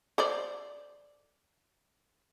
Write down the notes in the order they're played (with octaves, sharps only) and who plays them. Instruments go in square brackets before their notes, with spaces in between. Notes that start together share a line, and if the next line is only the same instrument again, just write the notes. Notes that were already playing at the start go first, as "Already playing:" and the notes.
[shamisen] A4 C5 D5